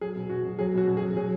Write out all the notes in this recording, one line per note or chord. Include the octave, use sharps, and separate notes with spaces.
F#3 G#4
B2
B2 F#4
F#3
F#3 G#4
B2 F#4
B2
G#4
F#3
F#3 G#4